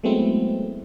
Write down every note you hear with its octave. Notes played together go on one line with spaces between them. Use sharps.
F#3 G#3 A3 B3 C4 E4